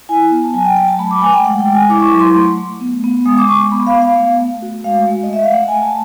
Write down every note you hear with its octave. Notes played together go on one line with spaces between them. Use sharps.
E4 G#5
B3
A5
F#3 G#5
G5
F#3 G5
A5
A3 B5
D6
A3 G#5
G5
G#3 F#5
G5
G#3
G#5
E4 D6
C#6
D6
F#3
C6
A3
A3
B3
B3
G#3 D#6
D6
G#3 C#6
D6
B3 B5
F5
B3
F5
A3 F5
A3
F#4
G#3 F5
A3
D#5
A3 E5
F5
A3 F#5
G#5
A3
A5